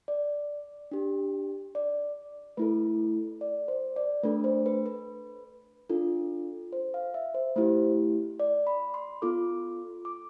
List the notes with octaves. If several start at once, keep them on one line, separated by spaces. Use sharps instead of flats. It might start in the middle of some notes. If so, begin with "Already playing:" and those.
D5
D4 G4
D5
A3 E4 A4 B4
D5
C5
D5
A3 D4 A4 B4
C5
B4
B4
D4 F4 A4
C5
F5
E5
C5
A3 E4 G4 C5
D5
B5
C6
B3 F4 A4 D6
D6